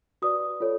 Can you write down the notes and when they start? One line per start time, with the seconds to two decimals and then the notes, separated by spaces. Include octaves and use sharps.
0.22 F#4 B4 D5 D#6
0.60 F4 A4 C#5